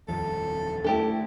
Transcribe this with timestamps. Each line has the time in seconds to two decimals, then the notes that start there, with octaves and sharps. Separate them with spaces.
0.08 D#1 F2 F3 A4
0.84 A3 A#3 D4 E4 G4 A4